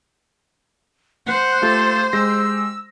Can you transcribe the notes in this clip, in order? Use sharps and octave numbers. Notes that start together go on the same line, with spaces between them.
C5 F#5
A3 F4 G4 A4
G#3 G4 E6 A#6